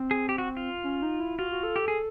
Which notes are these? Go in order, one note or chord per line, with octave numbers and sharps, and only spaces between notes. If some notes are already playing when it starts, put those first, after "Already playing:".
Already playing: C4
G#4
G4
F#4
F4
C#4
D#4
E4
F4 F#4
F#4
A4
G4
G#4